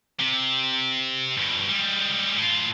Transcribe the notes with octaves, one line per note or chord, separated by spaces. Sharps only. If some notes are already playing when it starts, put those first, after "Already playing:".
C3
G2 B2
G3 G#3
A2 F4